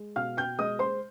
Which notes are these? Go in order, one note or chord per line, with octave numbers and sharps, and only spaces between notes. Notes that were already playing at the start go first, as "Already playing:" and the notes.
Already playing: G#3
B2 F5 F6
G5 G6
G#3 D#5 D#6
C5 C6